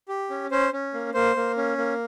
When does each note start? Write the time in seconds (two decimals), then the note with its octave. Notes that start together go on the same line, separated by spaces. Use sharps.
0.08 G4
0.30 C#4
0.51 C#4 C5
0.73 C#4
0.94 A#3
1.14 A#3 C5
1.36 A#3
1.57 C#4
1.77 A#3